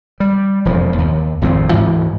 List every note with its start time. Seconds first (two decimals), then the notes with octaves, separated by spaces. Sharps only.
0.20 G3
0.65 E1 F2 F3
0.98 D#2
1.41 G#1 F2 A2 C4
1.73 D2 G#2 E3